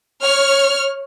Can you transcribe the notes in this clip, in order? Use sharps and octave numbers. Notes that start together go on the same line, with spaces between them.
C#5 F6